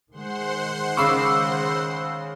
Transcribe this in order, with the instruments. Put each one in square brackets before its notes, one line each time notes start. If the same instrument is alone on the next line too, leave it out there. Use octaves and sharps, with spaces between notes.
[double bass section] D#3 G#3 [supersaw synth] C5 F#5 C6
[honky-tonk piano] C#3 B5 D6 [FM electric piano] C#6 E6 C7